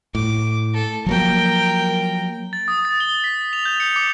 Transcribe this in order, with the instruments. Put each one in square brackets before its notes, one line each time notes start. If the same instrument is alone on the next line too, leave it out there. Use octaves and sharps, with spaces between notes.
[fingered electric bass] A2 [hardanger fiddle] D6
[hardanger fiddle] A4
[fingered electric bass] F3 F#3 A#3 [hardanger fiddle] A#4 G5
[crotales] A6
D#6
A6
G7
B6
F7
G6
C#7
D6